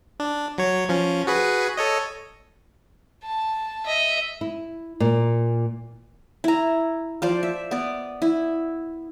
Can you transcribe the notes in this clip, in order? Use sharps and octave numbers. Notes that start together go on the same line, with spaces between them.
D4
F#3 C#5
F3 C#4
F#4 G#4 B4
A4 C#5 D#5
A5
D#5 E5
E4
A#2
E4 A#5
F3 C5 D5
E5
B3 D5
E4